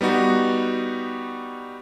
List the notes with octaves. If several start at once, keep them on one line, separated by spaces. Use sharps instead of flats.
G3 B3 D#4 F#4